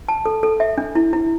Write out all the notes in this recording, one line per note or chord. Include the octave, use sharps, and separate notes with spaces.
A5
A4
A4
E5
D4
E4
E4